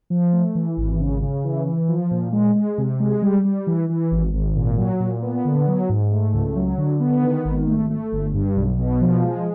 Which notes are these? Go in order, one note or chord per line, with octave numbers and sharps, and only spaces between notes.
F3
A3
E3
G#1
C#3
C#3
E3
E3
F3
A#2
G#3
G#3
C3
G#3
G3
G3
E3
E3
G#1
G#1
A#2
F#3
A#2
B3
D3
F#3
G#2
A3
C#2
F#3
D3
B3
D#3
G#1
A3
A3
G1
G2
B1
B2
F3
G#3